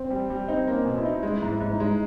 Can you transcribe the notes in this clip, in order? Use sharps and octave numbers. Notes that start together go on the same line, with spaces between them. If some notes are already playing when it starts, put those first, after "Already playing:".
Already playing: C4
G3
G3
C4 D#4
A#3
C#4
B2
E4
D#4
G#3 E4
G#2
E4
G#2
D#4
G#3